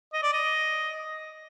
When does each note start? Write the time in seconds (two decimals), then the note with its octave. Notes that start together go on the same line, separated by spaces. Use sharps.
0.13 D#5
0.23 D5
0.32 D#5